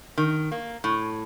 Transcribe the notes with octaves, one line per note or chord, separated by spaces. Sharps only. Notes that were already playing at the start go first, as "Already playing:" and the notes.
D#3
A#3
A2